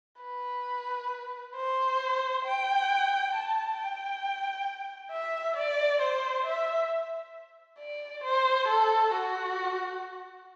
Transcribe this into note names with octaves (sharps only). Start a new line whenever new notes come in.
B4
C5
G5
A5
G5
E5
D5
C5
E5
D5
C5
A4
F#4